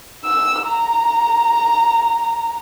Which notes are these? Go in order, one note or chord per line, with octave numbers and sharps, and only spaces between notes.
E6
A#5